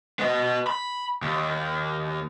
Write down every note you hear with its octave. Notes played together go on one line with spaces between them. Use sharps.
B3 D#5
B5
D#2